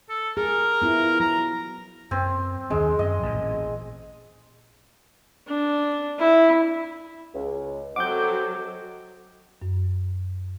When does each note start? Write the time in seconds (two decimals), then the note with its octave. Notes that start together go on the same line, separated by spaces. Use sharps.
0.09 A4
0.37 G#4 A#4
0.82 B3 E4 F4
1.20 F#3 A#5
2.11 F#2 C4
2.70 D#2 D#3 G#3 C4
2.99 F#2 D#5
3.23 A1 A#2
5.48 D4
6.19 E4
7.35 C#2
7.96 F#3 C4 A4 D#5 F#5 D6 G6
9.62 F#2